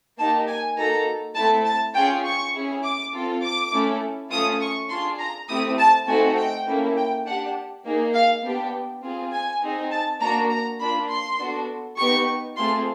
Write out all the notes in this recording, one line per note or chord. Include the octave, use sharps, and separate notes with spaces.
A#3 D#4 G4 A5
G#5
A#3 D#4 F#4 A4 A#5
A3 C4 E4 A4 A5
A5
C#4 F4 G#4 G5
C#6
C#4 E4 G#4
D6
C4 F4 A4
D6
A3 C#4 E4 A4
A3 C#4 F4 D#6
C#6
D4 F4 G#4 C6
A#5
A3 C4 E4 G4 D#6
A5
A3 C4 D#4 F#4 A4 G#5
G5
A#3 C#4 E4 A4
G5
D4 G4 F#5
A#3 D#4 G#4
F5
B3 D4 G4
C4 F4 G#4
G#5
C4 D#4 G#4
A5
A#3 D4 F#4 A#5
A#5
A#3 D4 F4 B5
C6
B3 D4 F#4 A4
B3 D#4 G4 C#6
A3 C4 F4 G#4 C6